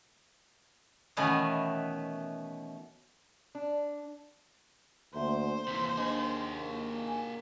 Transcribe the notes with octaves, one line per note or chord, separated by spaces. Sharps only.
B2 D#3 E3 A3 B3 C#4
D4
D2 A#3 C5 E5
D#2 C3 E3
A#3 D4 G#4 D#5
G#5